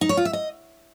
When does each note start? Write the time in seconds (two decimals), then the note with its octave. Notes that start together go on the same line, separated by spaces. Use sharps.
0.01 D#4
0.09 C#5
0.17 F4
0.25 E5
0.33 D#5